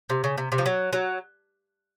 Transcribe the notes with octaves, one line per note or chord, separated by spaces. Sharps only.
C3
C#3
C3
C3
F3
F#3
F#3